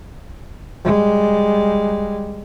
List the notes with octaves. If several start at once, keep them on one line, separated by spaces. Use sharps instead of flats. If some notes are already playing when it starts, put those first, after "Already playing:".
G3 G#3